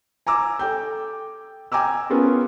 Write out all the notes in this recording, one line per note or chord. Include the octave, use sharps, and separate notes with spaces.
G#5 A#5 D6 E6
A4 G5 G6
G5 G#5 A#5 D6 E6
B3 C#4 F4 G#4 A#4